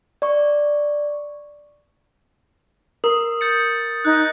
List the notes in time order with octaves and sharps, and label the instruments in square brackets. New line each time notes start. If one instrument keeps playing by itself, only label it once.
[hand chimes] D5 C#6
[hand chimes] A#4 [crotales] D#6
[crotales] G6 A6 C#7
[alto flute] D#4 [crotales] F#6